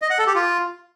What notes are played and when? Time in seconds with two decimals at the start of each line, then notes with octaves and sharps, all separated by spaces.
0.02 D#5
0.10 F#5
0.19 A4
0.27 G4
0.35 F4